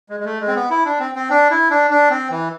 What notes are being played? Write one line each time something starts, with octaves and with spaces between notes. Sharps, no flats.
G#3
G#3
A3
G#3
C4
B3
E4
D4
C4
C4
D4
E4
D4
D4
C4
E3